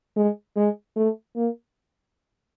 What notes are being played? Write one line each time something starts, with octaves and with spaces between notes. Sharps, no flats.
G#3
G#3
A3
A#3